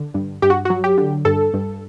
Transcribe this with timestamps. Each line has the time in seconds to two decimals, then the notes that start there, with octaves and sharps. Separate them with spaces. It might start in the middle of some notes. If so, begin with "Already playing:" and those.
Already playing: D3
0.14 G2
0.42 G2 G4
0.50 F#4
0.65 F#3 F#4
0.84 G4
0.98 D3
1.25 G2 A4
1.54 G2